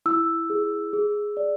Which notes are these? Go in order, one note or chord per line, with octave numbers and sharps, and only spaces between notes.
E4 E6
G#4
G#4
D5